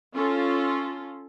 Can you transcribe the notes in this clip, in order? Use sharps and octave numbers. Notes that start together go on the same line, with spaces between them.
C#4 F4 A4